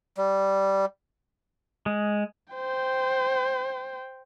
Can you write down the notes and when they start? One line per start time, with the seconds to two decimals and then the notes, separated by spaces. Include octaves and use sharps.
0.17 G3
1.86 G#3
2.53 C5 G5